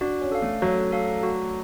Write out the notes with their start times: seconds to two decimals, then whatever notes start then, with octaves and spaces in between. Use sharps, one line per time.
0.01 D4 F#4
0.21 C#4
0.32 A4 F5
0.42 A3
0.62 F#3 F#4
0.92 A4 F5
1.23 F#4